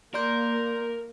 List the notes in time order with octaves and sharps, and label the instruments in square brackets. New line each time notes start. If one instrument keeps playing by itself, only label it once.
[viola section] A#3 [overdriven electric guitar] A#4 [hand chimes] D5 C6 G6